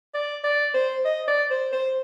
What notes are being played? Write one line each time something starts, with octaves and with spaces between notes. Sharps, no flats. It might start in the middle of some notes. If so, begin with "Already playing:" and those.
D5
D5
C5
D#5
D5
C5
C5